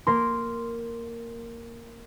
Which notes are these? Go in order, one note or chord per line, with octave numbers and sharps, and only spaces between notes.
A#3 A#4 C6